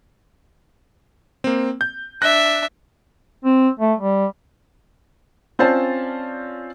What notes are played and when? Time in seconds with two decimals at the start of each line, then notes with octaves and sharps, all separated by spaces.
1.44 A#3 C4
1.81 G6
2.22 D4 E5 F#6 A#6
3.45 C4
3.79 A3
3.99 G3
5.59 C4 C#4 F4 C5 D5 A5